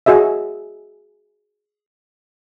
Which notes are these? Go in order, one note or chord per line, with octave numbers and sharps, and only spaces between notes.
F#4 G#4 D#5 E5